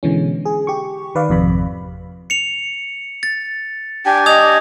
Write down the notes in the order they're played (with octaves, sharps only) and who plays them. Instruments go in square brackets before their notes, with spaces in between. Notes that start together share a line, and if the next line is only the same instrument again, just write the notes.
[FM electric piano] B2 D3 E3 G#3 C#4
G#4
G4 C#6
D#3 B4 D5 F5
G#1 F2 C3 B5
[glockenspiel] C#7 F7
A6
[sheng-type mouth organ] D4 G4 G#5 [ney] G5
[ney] D#5 [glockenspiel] D#6 G#6 F7